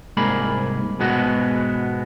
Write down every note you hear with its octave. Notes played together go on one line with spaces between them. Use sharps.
C2 G#2 A#3 G#4 B5
G#2 B2 G#3 B3 F#4